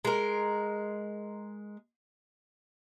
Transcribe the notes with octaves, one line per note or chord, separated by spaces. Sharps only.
G#3 A#4